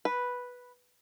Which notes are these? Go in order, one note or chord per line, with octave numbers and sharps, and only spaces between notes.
B4